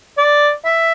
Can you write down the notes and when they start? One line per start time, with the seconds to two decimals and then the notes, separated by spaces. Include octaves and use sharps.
0.18 D5
0.65 E5